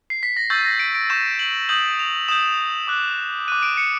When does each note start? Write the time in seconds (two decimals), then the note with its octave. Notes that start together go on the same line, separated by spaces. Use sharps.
0.10 C7
0.23 B6
0.37 A#6
0.50 C#6 E6 G6 A6
0.65 A#6
0.80 D7
0.95 D7
1.10 C#6 E6 G6 E7
1.39 F#7
1.69 D#6 G6 F#7
1.99 F7
2.28 D#6 G6 E7
2.88 D6 F#6
3.48 F#6 D#7
3.52 D6
3.63 D7
3.77 C#7